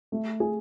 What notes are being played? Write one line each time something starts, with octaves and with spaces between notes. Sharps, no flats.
A3
G#4